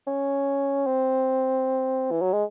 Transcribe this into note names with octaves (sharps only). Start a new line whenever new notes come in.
C#4
C4
E3
F#3
G#3